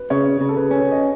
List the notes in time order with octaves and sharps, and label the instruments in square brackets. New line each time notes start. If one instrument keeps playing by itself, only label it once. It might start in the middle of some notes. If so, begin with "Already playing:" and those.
Already playing: [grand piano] B4
[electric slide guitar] C#3 [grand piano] C#5
[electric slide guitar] C#3
[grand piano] A4
B4
[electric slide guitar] C#4
[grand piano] D#5